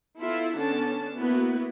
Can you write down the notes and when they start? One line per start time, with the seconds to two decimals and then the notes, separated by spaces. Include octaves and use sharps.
0.21 B3 E4 F4 A4 E5
0.57 D3 B3 C#4 D4 A5
1.18 A#3 B3 E4 F#4 B4